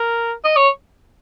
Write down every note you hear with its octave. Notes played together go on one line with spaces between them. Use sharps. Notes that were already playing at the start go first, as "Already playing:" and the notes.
Already playing: A#4
D#5
C#5